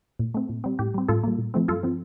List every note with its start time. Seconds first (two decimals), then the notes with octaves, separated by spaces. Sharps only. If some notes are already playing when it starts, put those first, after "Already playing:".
0.19 A#2
0.34 A3 C4
0.49 A#2
0.64 G3 C4
0.79 A2 G4
0.94 G3 C4
1.08 A2 F4 A4
1.23 G3 A#3
1.38 A#2
1.54 F3 A3 C4
1.68 G2 F4 A4
1.83 F3 C4